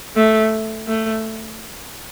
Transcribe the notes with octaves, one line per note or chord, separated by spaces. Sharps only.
A3
A3